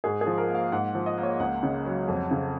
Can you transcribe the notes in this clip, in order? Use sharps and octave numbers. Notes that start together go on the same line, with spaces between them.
G#2 G#4
G#4
F3
A#4
A#3
F5
G#2 F#5
F3
D#5
A#3
C#5
C#2 F#5
C#3
F#3
F2
C#3